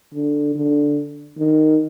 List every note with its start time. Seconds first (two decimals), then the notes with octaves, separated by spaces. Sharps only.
0.14 D3
0.55 D3
1.38 D#3